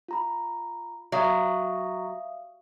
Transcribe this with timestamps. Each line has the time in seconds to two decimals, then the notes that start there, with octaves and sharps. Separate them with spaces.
0.08 F4 A#5 B5
1.12 F#3 E5 F5 D#6